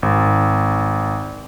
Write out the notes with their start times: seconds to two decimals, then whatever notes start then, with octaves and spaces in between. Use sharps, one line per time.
0.03 G#1